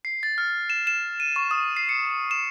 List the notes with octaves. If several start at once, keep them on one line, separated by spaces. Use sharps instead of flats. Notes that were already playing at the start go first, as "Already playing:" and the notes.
C7
A6
F6
E7
E7
D#7
C#6
D#6
C7
C#7
E7